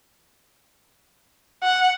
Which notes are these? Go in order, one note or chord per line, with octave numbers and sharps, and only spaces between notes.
F#5